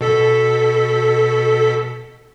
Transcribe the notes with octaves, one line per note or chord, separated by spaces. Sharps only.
B2 A4 B6